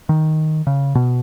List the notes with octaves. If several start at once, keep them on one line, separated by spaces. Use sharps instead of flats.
D#3
C#3
B2